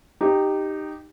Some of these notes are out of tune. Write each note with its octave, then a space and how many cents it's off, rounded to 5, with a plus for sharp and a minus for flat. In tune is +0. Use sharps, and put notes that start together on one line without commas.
D#4 -15 G4 +0